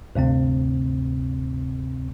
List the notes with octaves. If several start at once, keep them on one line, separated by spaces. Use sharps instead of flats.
D2 G2 C3 C4